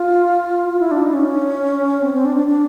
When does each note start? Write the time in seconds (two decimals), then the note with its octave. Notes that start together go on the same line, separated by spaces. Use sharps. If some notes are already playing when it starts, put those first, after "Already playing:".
Already playing: F4
0.69 F4
0.79 E4
0.91 D4
1.03 D#4
1.13 C#4
2.02 C4
2.14 C4
2.25 D4
2.36 D4
2.47 D4